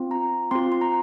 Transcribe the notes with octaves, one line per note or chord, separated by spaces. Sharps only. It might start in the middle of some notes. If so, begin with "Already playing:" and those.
Already playing: C4 F4
A#5
C4 F4 C6
C6
A#5